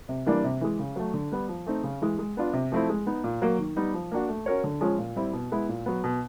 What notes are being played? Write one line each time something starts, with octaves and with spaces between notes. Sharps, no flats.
C3
E3 G3 A#3 D4
C3
E3 G#3
C#3
F#3 A3
D3
G3 B3
F3
A3 C4 D#4
C#3
E3 G#3
G#3
B3 D4 F4
C3
F3 A3 C4 E4
G#3
B3 D#4
A#2
F#3 A#3
D#3
G3 B3 D#4
F3
A#3 D4 F#4
A3
C#4 F#4 A#4 C#5
D3
F3 G#3 C#4 F4
A#2
G3 C4 E4
B2
G#3 B3 E4
A#2
F#3 B3
B2